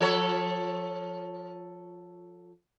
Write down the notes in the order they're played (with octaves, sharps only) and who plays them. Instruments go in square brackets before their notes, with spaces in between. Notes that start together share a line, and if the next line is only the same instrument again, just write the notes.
[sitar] F3 A4 C#5